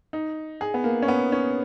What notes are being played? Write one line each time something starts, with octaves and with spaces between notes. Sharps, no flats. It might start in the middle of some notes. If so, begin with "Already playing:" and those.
D#4
G#4
B3
A#3
C#4
B3
C#4